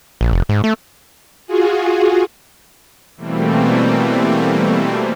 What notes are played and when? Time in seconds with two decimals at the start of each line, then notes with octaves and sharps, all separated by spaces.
0.21 A#1
0.33 F1
0.49 G#2
0.64 A3
1.47 F4 F#4 G#4
3.17 B2 E3 G3 A3 A#3 C4